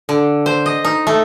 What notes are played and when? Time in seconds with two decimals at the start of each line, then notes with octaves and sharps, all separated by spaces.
0.09 D3
0.46 C5
0.66 D#5
0.85 D#4
1.07 A3